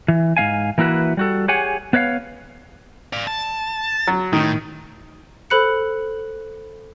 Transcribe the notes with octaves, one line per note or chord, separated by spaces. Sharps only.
E3
G#2 A3 F5 G#5
E3 A#3 E4 F#4 B4
G3 F#4 A4
G4 G#4 C#5 F#5 G#5
B3 B4 C#5 E5 F5
D5 F5
A5
F#3
A2 D#3
A4 C5 B5 F#6 C#7